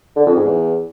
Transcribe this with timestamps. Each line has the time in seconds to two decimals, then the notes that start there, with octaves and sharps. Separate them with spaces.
0.16 D3
0.26 F2
0.36 G#2
0.45 E2